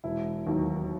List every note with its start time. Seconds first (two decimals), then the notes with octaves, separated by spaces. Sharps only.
0.04 E1 E4
0.47 D#2 D#3 F#3